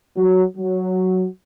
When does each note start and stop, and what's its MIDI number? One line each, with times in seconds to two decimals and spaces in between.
0.17 0.43 54
0.57 1.26 54